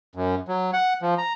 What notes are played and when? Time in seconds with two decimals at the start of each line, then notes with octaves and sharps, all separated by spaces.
0.15 F#2
0.48 F#3
0.73 F#5
1.02 F3
1.18 A#5